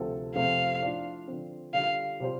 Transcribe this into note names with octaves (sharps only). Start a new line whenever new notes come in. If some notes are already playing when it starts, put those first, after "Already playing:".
Already playing: D2 C3 F3 C4 A4
F2 C3 A3 C4 F5
A2 F3 D4 F4
D3 F3 C4
D3 G3 F4 D5 F5
C3 G3 F4 C5